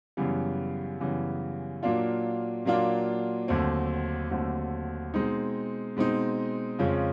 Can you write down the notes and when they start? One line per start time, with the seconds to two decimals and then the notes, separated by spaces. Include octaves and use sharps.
0.17 F#2 C#3 E3 G3 B3
1.00 F#2 C#3 E3 G3 B3
1.83 A#2 F#3 A#3 D4 F4
2.65 A#2 F#3 A#3 D4 F4
3.48 D#2 D3 F#3 A3 C4
4.31 D#2 D3 F#3 A3 C4
5.14 B2 G#3 C4 D#4
5.97 B2 G#3 C4 D#4
6.79 F2 C#3 F3 G#3 C#4